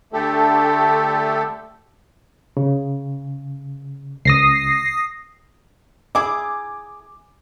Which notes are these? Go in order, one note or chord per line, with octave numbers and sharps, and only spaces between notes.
D3 A3 G4 A4
C#3
C#2 D#6 A#6 C7
E4 G#4 D6